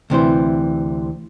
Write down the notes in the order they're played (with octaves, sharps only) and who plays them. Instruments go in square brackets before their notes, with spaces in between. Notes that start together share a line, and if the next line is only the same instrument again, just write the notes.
[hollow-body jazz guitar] D2 C3 E3 C5